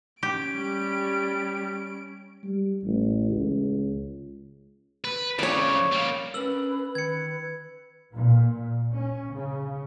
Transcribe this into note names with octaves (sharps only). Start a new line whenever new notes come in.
C#4 G4 D7
G3
G3
A1
C#2
B4
F2 C#3 C#5 D5
G3 A#3
C#4 D4 A#4 B4 E6 F#7
D#3 B4 G#6 C#7
A#2
C#4
C#3